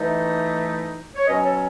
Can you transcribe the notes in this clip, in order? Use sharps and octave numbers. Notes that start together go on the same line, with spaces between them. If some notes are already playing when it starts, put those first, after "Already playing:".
Already playing: E3 A3 D#4
C#5
B2 F#3 C#4 B4 D#5
A4 C#5